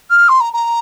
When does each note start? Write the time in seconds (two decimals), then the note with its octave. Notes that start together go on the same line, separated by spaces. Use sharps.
0.10 F6
0.29 C6
0.40 A#5
0.53 A#5